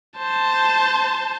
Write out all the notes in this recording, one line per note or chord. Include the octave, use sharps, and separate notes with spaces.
C5 A5